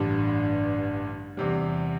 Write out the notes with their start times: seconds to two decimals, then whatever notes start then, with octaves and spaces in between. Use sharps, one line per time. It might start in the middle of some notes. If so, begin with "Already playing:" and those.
Already playing: A1 G2 D3 G3 D4
1.37 E2 C3 G3